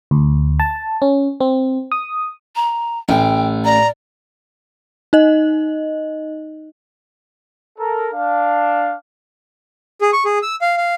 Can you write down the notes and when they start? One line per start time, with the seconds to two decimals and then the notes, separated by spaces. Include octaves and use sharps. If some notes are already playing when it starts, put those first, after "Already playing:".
0.11 D2
0.60 A5
1.02 C#4
1.40 C4
1.92 D#6
2.56 A#5
3.09 A1 G5
3.65 D5 A#5
5.13 D#4 D#5
7.78 A4 A#4
8.14 D4 F5
10.01 G#4
10.13 C#6
10.25 G#4
10.43 E6
10.61 F5
10.77 F5